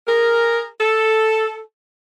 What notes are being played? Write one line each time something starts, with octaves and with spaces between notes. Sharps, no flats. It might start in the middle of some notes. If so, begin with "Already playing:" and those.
G#4 A#4
A4